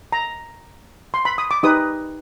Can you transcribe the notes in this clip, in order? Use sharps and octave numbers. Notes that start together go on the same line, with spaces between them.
A#5
C6
B5
D#6
D6
D#4 G4 B4 D#6